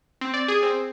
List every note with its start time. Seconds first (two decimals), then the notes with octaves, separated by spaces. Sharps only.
0.21 C4
0.34 D5
0.48 G#4
0.63 C4